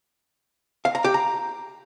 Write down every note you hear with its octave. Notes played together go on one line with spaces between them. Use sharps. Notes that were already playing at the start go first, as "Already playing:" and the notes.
F5
A#5
G4
A#5